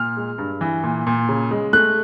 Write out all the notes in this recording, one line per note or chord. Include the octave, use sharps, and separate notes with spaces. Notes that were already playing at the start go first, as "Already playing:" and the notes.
Already playing: A#2 F6
G#3
G2
E3
A#2
A#2
C#3
G#3
A3 F#6